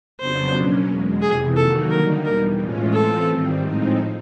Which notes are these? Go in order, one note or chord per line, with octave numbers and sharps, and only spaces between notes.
F2 C#3 F#3 B3 D4 C5
B2 F#3 A#3 C#4
E2 B2 G#3
F2 C3 E3 G#4
D#3 F#3 A#3 D#4 F#4 A4
D3 G3 A#3 D#4 A#4
E2 B2 G3 A#4
A2 E3 G#3 C#4 F4
E3 A3 C4 F4 A4
G#2 D#3 G3 C4
A2 F3 G#3 C4 D#4